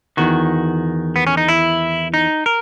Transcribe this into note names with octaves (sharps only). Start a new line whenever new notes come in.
E2 D#3 F#4
B3
C#4
D#4
E4
D#4
A#4